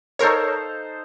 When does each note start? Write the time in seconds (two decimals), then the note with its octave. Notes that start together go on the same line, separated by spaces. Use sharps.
0.19 D#4 A4 A#4 C5 C#5 F5